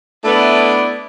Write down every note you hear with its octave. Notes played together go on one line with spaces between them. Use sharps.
A3 B3 D4 E4